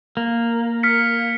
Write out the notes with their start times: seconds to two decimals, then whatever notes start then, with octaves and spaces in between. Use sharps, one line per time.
0.17 A#3
0.83 F6 B6 C#7